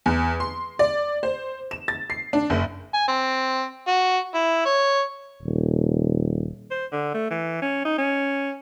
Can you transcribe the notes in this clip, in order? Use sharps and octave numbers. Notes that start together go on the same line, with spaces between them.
E2
C6
D5
C5
E7
A6
C7
D4
F#1
G#5
C4
F#4
E4
C#5
D#1
C5
D3
A3
E3
C#4
D#4
C#4